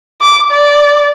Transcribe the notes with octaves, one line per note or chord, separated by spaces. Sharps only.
D6
D5